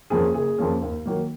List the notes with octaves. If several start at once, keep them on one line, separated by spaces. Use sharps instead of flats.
F2 F3 A#3 C#4 G#4
F#1 G#4
F2 F3 A#3 C#4
D#2
D#3 F#3 A#3